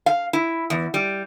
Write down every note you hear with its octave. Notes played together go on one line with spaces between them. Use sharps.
F5
E4
E2
G3